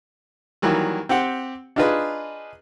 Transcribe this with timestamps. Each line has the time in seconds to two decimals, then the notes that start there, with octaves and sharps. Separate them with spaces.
0.62 D#3 E3 F#3 G3 A#3
1.09 C4 G4 F#5
1.76 D4 D#4 F4 G#4 B4 D#5